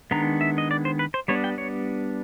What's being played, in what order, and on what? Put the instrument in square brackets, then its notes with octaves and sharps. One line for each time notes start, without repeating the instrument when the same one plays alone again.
[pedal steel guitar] D#3 G#3 B3 D4 A#5
E5
D#5
D5
C5
B4
C5
G3 B3 D4 C#5
G5
C#5